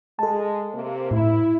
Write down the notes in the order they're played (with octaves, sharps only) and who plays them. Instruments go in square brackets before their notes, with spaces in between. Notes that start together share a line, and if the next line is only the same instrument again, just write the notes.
[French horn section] G#3 [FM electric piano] A4 A5
[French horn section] C3 A#3
[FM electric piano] A2 [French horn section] E4